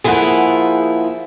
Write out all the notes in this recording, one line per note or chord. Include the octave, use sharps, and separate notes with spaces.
F3 A#3 E4 G#4 F#5